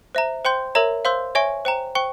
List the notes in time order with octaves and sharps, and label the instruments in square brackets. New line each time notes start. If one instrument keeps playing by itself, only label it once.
[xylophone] C5 E5 A#5
C5 G5 C6 G6
A#4 C#5 E5 A#5
C5 F5 C6 E6 G6
C#5 E5 G#5 C#6
C5 G5 A#5
C5 G5 C#6